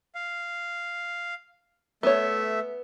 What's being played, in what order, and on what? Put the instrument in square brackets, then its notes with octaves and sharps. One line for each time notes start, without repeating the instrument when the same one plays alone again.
[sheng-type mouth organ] F5
[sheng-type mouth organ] A3 E5 [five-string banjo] B3 C#5